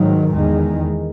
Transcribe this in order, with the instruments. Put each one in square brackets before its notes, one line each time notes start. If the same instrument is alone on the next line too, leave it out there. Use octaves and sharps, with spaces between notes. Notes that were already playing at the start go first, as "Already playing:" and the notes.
Already playing: [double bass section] G#2 D#3 F#3
E2 D#3 G#3